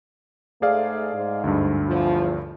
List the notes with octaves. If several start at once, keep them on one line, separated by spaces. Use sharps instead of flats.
G#2 A3 G#4 D5 F5
G#2
D2 G2
E2 F3